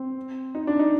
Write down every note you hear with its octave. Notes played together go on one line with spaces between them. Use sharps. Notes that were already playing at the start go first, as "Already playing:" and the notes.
Already playing: C4
D#4
D4
D#4